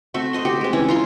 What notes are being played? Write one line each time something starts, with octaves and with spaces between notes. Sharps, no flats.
A3 C4 F#4 E5
C5 D#5 C6
F#4 G4
G#3 C4
E3 C#4 E4
F4 A#5 C6